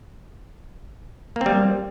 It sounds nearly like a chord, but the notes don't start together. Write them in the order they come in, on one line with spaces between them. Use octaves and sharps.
A#3 C4 G3